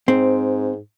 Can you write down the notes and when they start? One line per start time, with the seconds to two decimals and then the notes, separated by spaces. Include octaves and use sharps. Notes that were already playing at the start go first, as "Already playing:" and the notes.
0.08 G#2 C4